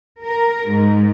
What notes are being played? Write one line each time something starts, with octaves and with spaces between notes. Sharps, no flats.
A#4
G#2